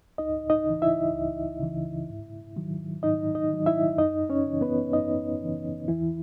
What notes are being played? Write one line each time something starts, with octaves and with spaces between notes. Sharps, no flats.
C#2 D#4 D#5
D#4 D#5
C#3 E3
E4 E5
C#2
C#3 E3
G#2
D#3 F#3
G#2 D#4 D#5
D#4 D#5
D#3 F#3
E4 E5
F#2 D#4 D#5
C#4 C#5
C#3 E3
B3 B4
F#2 D#4 D#5
C#3 E3
E2 E3 E4